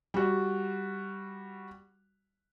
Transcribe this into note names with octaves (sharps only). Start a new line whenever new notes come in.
G3 F#4